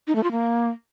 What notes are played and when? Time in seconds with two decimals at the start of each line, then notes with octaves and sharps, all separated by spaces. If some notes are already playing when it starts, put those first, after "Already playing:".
0.07 D#4
0.15 A3
0.23 F4
0.31 A#3